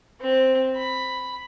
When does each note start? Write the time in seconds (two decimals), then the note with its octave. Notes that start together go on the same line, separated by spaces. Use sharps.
0.21 C4
0.76 B5